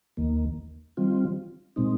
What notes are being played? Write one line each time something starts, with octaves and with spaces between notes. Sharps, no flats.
D#2 D#3 A#3
D#3 G3 C4 F4
A#2 G#3 C4 D#4